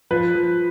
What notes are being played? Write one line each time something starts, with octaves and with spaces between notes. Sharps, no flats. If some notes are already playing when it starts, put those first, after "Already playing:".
F3 B4
F3